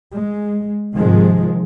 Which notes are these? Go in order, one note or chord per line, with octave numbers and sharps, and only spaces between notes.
G#3
G#2 C3 D#3 F3 G#3